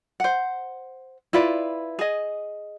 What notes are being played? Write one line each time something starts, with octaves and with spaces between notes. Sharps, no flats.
C5 F#5
E4 F4 B4 D5
G#4 D#5